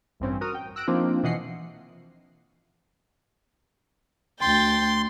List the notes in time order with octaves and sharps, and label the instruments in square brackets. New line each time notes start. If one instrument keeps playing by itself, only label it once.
[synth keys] A1 G2 C4 C#4
F#4 A#4 D#6 F6
G5
E6 F#6 A#6 D7
F3 A#3 C4 D4 D#4 F4
B2 E3 D#5 F#5 C7 C#7
[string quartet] D2 G5 A6 [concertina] C6